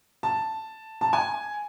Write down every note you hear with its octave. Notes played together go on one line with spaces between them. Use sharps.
A5
A5
G#5